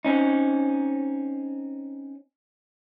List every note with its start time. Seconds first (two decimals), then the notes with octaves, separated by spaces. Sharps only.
0.05 C4 C#4 D#4